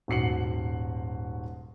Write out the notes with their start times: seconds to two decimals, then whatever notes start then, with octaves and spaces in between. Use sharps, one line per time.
0.08 D#1 G#2 F#4 C7 C#7 F#7